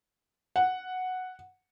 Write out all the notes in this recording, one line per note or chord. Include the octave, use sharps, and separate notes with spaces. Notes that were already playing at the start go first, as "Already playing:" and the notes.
F#5